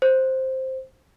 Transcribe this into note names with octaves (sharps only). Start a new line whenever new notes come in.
C5